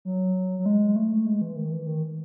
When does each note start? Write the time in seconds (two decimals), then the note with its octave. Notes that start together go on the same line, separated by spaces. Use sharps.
0.05 F#3
0.59 F#3
0.66 G#3
0.96 A3
1.26 G#3
1.41 E3
1.56 D#3
1.72 E3
1.86 D#3